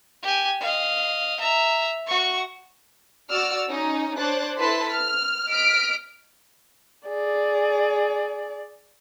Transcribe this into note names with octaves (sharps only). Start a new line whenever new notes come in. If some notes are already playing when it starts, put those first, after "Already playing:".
G4 G#5
D#5 F5
E5 A#5
F#4 C#6
F#4 D5 E6 F6
C#4 D#4
D4 C5 C#5 F#6 A6
E4 A4 B4 A5 C6 B6
F6
D#5 F6 B6 D7
G#4 D5